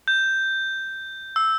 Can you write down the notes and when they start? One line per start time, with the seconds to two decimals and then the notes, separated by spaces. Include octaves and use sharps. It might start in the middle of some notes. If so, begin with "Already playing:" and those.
0.08 G6
1.36 E6